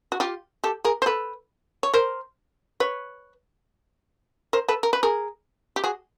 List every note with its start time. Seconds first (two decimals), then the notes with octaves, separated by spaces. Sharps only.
0.12 F#4
0.20 F4 G4
0.64 G4 A4
0.85 G#4 A#4
1.02 C5
1.06 A4 B4
1.83 C#5
1.93 A#4 C5
2.80 B4 C#5
4.53 A#4 C5
4.68 A4 B4
4.83 A#4
4.93 B4
5.03 G#4 A#4
5.76 G4
5.84 F#4 G#4